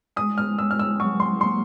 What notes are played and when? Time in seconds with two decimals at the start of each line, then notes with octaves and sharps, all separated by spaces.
0.16 G#3 D#6
0.38 F6
0.58 G#3 E6
0.71 F6
0.79 E6
1.00 F#3 C#6
1.20 C6
1.40 A#3 C6